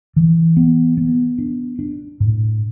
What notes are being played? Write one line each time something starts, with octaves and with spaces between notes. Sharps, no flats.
E3
B3
B3
D4
D4
A2